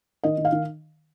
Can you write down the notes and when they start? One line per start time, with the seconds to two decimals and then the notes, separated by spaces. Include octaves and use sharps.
0.23 D#3 D#5
0.38 D#3
0.45 F5
0.52 D#3